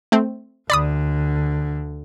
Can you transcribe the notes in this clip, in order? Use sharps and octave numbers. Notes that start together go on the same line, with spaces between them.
A3 C4
D2 D3 D5 B5 D#6